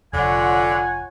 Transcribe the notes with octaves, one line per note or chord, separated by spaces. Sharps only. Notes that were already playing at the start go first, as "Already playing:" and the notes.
F1 D3 F4 C#5 F#5 G#5